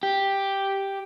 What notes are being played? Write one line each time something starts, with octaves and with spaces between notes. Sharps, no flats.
G4